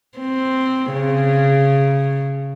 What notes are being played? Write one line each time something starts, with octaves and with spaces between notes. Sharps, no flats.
C4
C#3